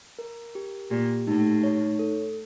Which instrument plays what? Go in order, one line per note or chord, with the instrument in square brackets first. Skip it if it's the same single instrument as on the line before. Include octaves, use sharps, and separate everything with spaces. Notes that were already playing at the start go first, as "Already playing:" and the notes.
[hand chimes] A#4
G4
[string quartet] A#2 [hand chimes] G4
[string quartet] A2 [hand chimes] D#4
[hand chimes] C#5
A4